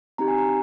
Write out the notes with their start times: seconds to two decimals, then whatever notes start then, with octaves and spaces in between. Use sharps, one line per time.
0.18 C4 D#4 G4 A#5
0.28 G#5
0.38 A#5